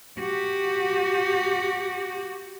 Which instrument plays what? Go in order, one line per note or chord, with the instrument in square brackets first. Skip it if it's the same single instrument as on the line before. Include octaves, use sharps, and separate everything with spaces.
[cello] F#4 G4